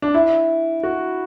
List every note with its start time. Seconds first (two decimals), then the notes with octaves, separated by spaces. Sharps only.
0.02 D4
0.14 E4
0.83 F#4